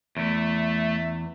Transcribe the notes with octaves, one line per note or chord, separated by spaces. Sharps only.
E2 A3